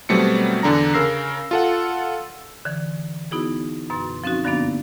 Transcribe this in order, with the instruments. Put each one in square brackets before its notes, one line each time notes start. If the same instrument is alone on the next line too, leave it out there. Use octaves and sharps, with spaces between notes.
[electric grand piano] B2 F#3 G3 A3 C4 C#7
E2 D3 D4 A#5 A#6
C#3 A#4 E6 A#6 C7
F4 A4 F#5
[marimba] D3 E3
B3 D#4 E4 F#4 G#4
F#2 B2 C6 A6
F3 C4 C#4 D#4 F#4
G2 D3 F3 A#3 B3 D4